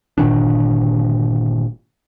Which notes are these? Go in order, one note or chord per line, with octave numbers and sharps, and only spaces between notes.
G1 A#2 D#3 D4